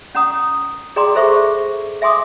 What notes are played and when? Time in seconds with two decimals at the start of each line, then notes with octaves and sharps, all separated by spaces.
0.15 C#4 F#5 A#5 D#6
0.96 G#4 D5 G5 A#5 C6 D6
1.15 G#4 A4 C5 E5 C#6
2.02 E5 G#5 C6 D6 D#6